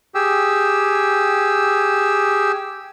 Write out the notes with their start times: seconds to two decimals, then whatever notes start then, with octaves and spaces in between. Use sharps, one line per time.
0.15 G4 G#4 E6